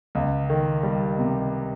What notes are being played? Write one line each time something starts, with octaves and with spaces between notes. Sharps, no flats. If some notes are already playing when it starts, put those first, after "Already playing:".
C#2
D#3
G3
C3